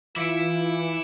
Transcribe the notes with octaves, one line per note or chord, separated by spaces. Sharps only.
E3 E4 F4 E5 D6 C#7 D7